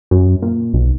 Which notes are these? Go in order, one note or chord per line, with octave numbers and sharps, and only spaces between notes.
F#2
A#2
B1